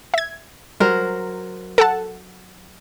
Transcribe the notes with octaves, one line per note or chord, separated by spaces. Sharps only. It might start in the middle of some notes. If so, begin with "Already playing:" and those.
E5 G#6
F#3 G3 A#4 C5
A4 F#5 A5